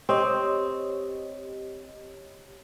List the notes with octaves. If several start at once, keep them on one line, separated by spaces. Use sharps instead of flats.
C4 G4 C#5 D#5